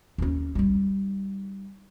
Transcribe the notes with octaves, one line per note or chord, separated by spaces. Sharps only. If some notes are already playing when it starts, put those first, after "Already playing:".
D#2 C#4
G3 D#4